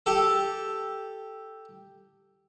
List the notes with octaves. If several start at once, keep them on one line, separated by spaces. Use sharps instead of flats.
G4 A4